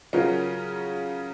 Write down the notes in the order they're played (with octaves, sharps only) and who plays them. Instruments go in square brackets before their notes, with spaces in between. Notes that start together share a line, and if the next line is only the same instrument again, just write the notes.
[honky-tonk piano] C#3 F#3 C#4 F4 A#4